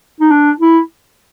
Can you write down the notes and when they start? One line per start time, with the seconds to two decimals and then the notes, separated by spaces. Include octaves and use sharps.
0.20 D#4
0.31 D4
0.60 E4